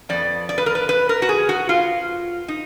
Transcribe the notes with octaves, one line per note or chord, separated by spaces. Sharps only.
F2 F3 B3 D5
D5
B4
A#4
B4
B4
A#4
F#4
G#4
F#4
F4
D#4